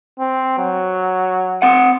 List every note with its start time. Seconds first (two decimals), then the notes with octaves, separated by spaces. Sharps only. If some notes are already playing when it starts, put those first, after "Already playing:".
0.19 C4
0.58 F#3
1.62 C4 F#5